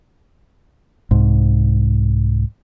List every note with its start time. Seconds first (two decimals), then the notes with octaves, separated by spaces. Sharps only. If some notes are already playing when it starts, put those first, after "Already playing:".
1.11 C2 G#2